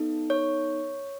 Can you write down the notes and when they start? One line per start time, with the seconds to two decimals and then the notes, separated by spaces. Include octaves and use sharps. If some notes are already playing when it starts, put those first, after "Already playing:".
Already playing: B3 D#4 A4
0.30 C#5